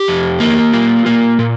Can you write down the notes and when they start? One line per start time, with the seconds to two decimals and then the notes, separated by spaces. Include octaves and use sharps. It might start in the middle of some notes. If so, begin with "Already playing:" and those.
Already playing: G4
0.08 F2
0.40 A#3
0.73 F4
1.06 A#3
1.39 A#2